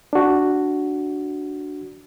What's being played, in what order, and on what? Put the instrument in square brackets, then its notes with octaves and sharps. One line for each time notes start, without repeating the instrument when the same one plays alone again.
[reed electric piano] D4 F#4